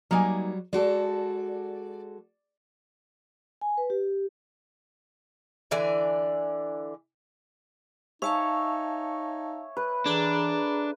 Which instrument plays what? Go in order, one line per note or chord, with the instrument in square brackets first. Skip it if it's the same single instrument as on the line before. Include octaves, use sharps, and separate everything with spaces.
[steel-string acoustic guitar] F#3 G3 [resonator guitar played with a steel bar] A#3 D#4 G#5
[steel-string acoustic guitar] G#3 F#4 A4 [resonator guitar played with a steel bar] D5
[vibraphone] G#5
B4
G4
[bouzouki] D3 E3 D5 G#5
[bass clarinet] D#4 [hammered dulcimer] C#5 E5 G#5 [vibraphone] F5 A5 C#6
[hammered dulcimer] B4
[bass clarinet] E3 [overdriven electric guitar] D4 [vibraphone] G#4 A4 A#5